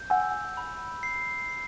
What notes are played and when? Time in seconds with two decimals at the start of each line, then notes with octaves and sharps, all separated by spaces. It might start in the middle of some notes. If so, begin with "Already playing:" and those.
Already playing: G6
0.10 F#5 G#5 E6
0.57 B5
1.03 C7
1.49 C7